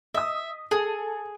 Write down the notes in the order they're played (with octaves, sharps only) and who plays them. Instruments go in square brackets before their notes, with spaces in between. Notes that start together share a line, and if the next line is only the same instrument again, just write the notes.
[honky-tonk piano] D#5 D#6 [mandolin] E5
[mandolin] G#4 [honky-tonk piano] A4